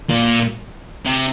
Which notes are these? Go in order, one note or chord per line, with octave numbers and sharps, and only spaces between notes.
A#2
C3